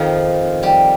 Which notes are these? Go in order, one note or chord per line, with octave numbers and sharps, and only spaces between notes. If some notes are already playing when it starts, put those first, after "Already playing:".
Already playing: F2 D#3 F3 F4
G3 G4